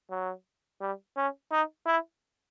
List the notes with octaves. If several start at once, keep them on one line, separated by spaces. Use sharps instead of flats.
F#3
G3
C#4
D#4
E4